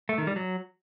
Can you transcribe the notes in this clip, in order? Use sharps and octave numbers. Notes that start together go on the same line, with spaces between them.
A3
D#3
G3
F#3